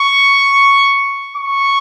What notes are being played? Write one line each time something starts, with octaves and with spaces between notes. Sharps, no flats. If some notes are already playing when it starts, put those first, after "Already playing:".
Already playing: C#6
C#6